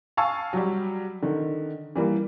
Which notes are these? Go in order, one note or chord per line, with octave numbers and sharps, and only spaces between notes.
F5 G#5 A5 C#6 E6
F#3 G3
D3 D#3
E3 G3 A#3